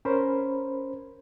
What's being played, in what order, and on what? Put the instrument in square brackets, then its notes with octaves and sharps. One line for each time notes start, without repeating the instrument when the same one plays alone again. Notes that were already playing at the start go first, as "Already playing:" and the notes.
[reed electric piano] C#4 A#4 C5 B5